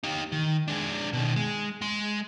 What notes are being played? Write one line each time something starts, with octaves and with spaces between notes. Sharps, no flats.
D#4 G4
D#3
G#3 D4
B2 D#3
G#3
G#3 C6